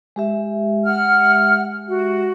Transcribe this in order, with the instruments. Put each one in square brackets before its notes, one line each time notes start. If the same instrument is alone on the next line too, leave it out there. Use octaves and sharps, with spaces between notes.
[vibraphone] G#3 G4 E5
[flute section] F#5 F6
F#4